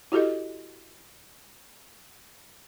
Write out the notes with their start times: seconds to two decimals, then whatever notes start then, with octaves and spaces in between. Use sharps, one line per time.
0.12 E4 F#4 G4 A4 D#5